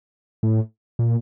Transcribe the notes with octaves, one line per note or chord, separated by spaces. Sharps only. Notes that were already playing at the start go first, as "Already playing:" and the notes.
A2
A#2